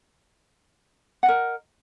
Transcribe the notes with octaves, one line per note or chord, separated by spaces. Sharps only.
A#4 D#5 F#5